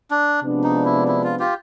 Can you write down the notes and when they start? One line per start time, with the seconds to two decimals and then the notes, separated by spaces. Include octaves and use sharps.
0.11 D4
0.43 C3 F3 G#3 B3 D4
0.64 D#4
0.85 E4
1.08 E4
1.24 F4
1.40 F4 G4